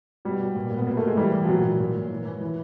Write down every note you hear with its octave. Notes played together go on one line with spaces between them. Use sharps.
B2 G3
B2
A#2
A#2
B3
B2 A#3
A3
B2
G#3
E3 G3
E3
F3
A#2 F#3
A#2
A#2
A#2
E3
E3
E3